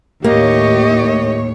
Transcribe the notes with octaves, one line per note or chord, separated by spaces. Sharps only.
D#2 A2 A#3 G4 C#5 D#5